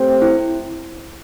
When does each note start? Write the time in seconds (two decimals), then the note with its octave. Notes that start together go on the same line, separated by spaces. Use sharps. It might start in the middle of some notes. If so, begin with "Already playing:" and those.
Already playing: A3 C4 G4 C5
0.22 E4